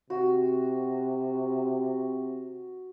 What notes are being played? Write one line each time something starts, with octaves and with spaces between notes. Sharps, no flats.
C3 F#4